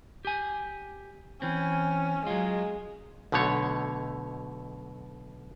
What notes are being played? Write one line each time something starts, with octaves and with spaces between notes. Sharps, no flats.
G4 G#5
E3 C4 C#4
F#3 G#3 F4
B1 B2 D3 A3 C#5